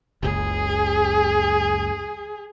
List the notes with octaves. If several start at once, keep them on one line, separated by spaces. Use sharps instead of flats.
F#1 C#2 G#4